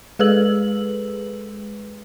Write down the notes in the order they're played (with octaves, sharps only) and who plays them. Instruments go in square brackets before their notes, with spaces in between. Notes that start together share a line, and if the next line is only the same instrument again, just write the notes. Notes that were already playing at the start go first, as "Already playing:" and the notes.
[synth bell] G#3 G#4 A4 B4 E6 F#7